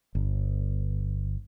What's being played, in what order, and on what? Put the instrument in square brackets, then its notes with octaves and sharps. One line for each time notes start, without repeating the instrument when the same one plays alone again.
[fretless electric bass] G1